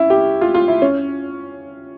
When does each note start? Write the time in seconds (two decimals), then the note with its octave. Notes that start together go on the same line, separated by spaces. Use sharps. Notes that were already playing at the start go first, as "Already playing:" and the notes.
Already playing: C#4 E4
0.10 G4
0.41 F4
0.54 F4
0.68 E4
0.82 C#4